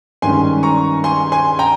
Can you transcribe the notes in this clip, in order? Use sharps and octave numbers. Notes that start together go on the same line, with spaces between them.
G2 D#3 G#3 C#4 G#5 C6
A#5 C#6
G#5 C6
G#5 C6
G5 A#5